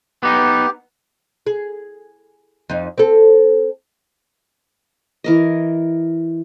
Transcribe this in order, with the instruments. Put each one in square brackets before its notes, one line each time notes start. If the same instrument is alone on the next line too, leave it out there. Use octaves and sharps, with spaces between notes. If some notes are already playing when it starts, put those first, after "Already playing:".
[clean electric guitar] B3 D#4 [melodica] G4
[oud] G#4
F2 D#4
C4 A4
[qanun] E3 A#4 D#5